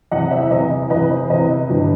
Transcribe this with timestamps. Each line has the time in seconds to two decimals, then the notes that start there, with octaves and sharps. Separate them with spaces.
0.11 E2 C3 E3 D#5 F#5
0.31 C5 E5
0.50 E2 C3 E3 B4 D#5
0.90 E2 C3 E3 B4 D#5
1.11 C5
1.30 E2 C3 E3 B4 D#5
1.69 G1 G2 E3